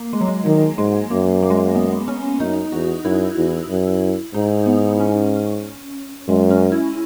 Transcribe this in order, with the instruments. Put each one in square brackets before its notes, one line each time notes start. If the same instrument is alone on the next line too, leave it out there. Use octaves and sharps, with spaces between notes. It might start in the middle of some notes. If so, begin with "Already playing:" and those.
Already playing: [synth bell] A#3
G#3
F#3
G#3
[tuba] D#3 [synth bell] F#3
[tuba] G#2 [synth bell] G#3
[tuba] F#2 [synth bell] A#3
[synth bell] A#3
G#3
A#3
B3
C#4
[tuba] F#2 [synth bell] D#4
[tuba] E2 [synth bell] F#4
[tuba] F#2 [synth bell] E4
[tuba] E2
F#2
[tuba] G#2 [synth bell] D#4
[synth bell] B3
C#4
[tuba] F#2 [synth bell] G#3
[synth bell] C#4
E4